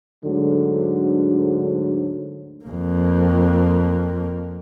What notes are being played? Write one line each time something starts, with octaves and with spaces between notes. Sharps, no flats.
D2 G#2 D3 F#3
F2 A#3